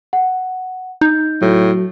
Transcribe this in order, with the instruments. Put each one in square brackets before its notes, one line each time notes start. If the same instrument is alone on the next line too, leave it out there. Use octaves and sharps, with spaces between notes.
[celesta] F#5
[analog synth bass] D#4 [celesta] G6
[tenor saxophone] A2 [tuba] F#3